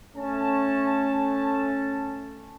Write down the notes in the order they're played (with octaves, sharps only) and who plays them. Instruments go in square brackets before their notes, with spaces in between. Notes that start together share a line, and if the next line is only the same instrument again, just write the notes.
[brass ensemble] A3 C#4 A5